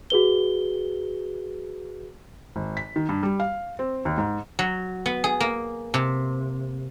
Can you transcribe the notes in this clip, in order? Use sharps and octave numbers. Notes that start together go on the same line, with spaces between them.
F#4 G#4 B4 G7
G#1
B6
D#3
G2
G3
F5
C4
D#2
G#2
F#3
B3
G#4
A#3
C3